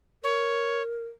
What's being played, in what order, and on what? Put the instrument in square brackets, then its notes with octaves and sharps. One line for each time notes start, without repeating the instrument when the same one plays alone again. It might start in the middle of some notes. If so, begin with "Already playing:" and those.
[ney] A#4 [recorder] C#5